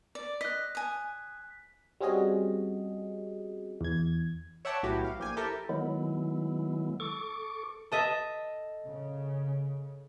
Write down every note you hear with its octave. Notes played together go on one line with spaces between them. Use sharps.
D5
D#5 F#6 B6
G#5 D#6
G3 C4 C#4 F#4 G#4 D#5
E2 G#6
C#5 E5 F#5 G5 A5 D6
B1 A2 E4 F#4 G4 F#6
F5
A#1 G4 G#5
E4 G4 A4 A#4
D#3 F#3 G#3 B3 E4
A4 C#6 D6
A4 D#5 E5
C#3